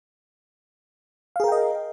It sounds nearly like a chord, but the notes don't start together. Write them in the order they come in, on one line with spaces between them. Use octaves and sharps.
F5 G#4 A#4 G5 D#5